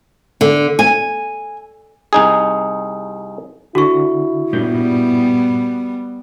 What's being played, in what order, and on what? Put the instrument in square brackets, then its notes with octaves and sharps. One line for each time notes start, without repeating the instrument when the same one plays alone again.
[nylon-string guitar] D3
G#5
[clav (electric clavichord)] C2 D#4 G#4
[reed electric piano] D3 [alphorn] E4 [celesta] F#4 C#6
[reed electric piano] G2 A#2 G6 [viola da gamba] G3 B3